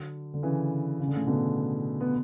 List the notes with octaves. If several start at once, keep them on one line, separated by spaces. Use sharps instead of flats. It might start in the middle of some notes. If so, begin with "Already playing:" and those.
Already playing: D3 F#3
D3
C#3 E3
C#3
D3
A2 C#3
B2 D3
B3